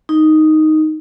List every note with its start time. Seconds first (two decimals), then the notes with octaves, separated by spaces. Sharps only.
0.09 D#4